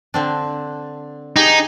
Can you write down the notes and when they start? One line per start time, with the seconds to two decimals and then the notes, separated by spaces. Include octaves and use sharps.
0.14 D3 C4 D4
1.36 D#4 G4 G#4